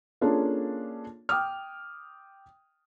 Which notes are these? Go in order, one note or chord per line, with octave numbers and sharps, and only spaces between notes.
A#3 C#4 D4 F4 G#4 A4
G5 D6 D#6 F6